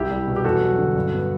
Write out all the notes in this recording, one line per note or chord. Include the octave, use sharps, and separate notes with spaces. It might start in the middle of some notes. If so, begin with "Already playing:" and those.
Already playing: C2 E4 G4
G3
B2
G4
E2 F#4 A4
F#3
D3
G2
B3